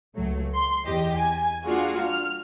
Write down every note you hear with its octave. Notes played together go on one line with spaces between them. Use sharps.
C#2 F#3 A3
C6
E2 G4 D#5
G#5
G3 A#3 D4 F4 F#4 G#4
F6